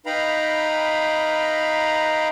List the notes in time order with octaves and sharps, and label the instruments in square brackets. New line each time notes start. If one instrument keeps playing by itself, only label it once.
[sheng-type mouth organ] D#4 B4 F5 G5 A#5 B5